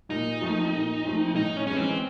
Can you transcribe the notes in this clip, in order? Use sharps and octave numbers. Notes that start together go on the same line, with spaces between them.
A#2 D#4
F3 A3 C4
A#2
F3 A3 C4
A2 D#4
C#4
E3 G#3 C#4
C4